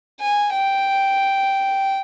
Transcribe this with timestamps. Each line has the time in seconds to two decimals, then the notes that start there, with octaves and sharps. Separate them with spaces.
0.21 G#5
0.55 G5